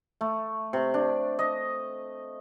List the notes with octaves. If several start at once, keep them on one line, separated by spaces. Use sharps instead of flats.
A3
C3
D4
D#5